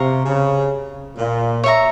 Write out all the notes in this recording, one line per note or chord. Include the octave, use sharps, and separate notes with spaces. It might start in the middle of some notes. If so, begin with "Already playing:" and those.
Already playing: C3 F5 A#5 C#6
C#3
A#2
C#5 E5 A#5